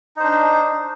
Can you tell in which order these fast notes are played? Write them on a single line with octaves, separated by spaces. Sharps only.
D#4 C5 D4